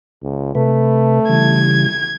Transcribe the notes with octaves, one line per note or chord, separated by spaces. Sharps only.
C#2
C3 A3 B4
C#3 E3 G3 G#6